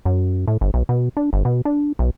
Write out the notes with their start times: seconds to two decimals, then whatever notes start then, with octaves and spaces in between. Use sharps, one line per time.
0.05 F#2
0.48 A2
0.61 G1
0.74 B1
0.89 B2
1.17 D4
1.33 G1
1.45 B2
1.65 D4
1.99 B1